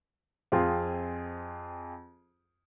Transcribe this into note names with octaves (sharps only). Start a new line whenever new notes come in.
F2 C4 F4 G#4 G#5 C6